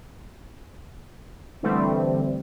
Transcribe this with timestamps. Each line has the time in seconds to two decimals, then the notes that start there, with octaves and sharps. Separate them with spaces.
1.63 D3 E3 G3 A3 C4